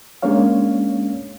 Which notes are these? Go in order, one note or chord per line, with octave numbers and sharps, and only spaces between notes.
G#3 A#3 C#4 D4 C#5 F5